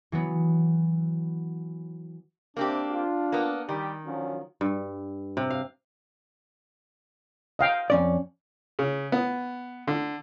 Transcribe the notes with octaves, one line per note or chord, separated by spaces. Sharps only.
E3 F#3 B3
C3 A#3 C4 D4 G4
F4
A#3 B3
D#3 G3 G4
D3 F3 F#3 C#4
G2
C3
F5
D#5 F5 G5
F2 C#4 D5
C#3
B3
D3